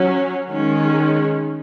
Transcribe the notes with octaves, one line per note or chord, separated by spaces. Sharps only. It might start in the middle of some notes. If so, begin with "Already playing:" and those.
Already playing: F#3 C#4
D#3 G#3 C#4